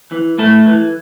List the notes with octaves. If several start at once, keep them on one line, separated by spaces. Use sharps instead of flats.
E3
A2 A3 A4
E3